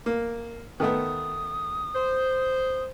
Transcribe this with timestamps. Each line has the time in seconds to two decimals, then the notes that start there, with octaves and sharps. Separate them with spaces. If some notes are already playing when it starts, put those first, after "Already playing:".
0.06 A#3
0.80 D#3 A3 B3 D#6
1.95 C5